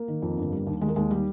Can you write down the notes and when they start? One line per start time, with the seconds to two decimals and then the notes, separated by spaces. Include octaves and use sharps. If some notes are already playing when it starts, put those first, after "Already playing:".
Already playing: A#3
0.08 D#3
0.22 F2
0.37 G1
0.52 G3
0.67 D#2
0.81 D#3 G#3
0.88 A#3
0.96 D#2 G#3
1.11 G3